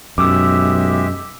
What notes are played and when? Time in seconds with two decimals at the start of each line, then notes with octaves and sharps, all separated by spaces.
0.18 B1 F#2 G#3 G4 E5 D6 E6